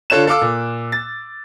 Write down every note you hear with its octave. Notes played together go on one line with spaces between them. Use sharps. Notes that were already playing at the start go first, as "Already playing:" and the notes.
D3 F4 A4 C#5 F#6 E7
A4 F5 D6 E6
A#2
A6